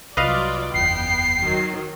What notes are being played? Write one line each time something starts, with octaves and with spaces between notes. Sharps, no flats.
C2 F#3 F4 B4 D5 D#5 F5
F#1 E2 B3 G5 C7
D#3 F#3